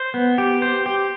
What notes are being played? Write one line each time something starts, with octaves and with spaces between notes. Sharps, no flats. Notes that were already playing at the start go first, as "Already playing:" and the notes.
Already playing: C5
B3
G4
C5
G4